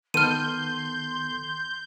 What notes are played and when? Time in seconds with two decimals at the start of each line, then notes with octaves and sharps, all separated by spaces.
0.14 D#3 B3 A4 C6 F6 G6 D#7